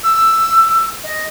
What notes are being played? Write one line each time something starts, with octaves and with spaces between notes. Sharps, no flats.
E6
D#5